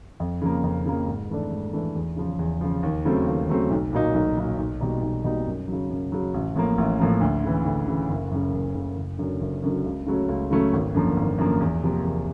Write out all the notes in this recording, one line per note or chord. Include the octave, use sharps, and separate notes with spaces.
F2
C#3 F3 A#3
F2
C#3 F3 A#3
G#2
E3 A3 D4
G#2
E3 A3 D4
E2
C#3 F3
E2
C#3 F3
D#2
C#3 F#3 A3 C4
D#2
C#3 F#3 A3 C4
B1
A#2 F#3 A#3 D#4
B1
A#2 F#3 A#3 D#4
B1
B2 G3 A#3 D#4
B1
B2 G3 A#3 D#4
F#2
C#3 F#3
F#2
C#3 F#3
A1
A2 F3 A#3
A1
A2 F3 A#3
D2
C#3 E3
D2
C#3 E3
F#1
F#2 C#3
F#1
F#2 C#3
F#1
F#2 D3 F#3
F#1
F#2 D3 F#3
C#2
C#3 F#3 A3 C#4
C#2
C#3 F#3 A3 C#4
G#1
F#2 D3 F3 A#3
G#1
F#2 D3 F3 A#3
E2
C3 F3 A#3
E2